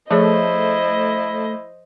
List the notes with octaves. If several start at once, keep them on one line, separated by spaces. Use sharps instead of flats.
F3 A3 E4 G#4 C5 C#5 D#5